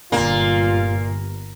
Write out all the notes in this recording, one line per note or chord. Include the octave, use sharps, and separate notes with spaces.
G1 A#2 A#3 F4